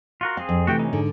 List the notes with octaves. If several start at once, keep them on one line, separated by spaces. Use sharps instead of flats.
F4 F#4 A#4
C4 G#4 F5
F2
C3 E3 A3 F#4 G4 G5
C#4 D#4
G#2 D3